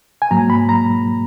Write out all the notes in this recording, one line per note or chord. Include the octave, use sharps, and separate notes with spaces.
G#5
G#2 F#3 A#3 A#5
B5
A#5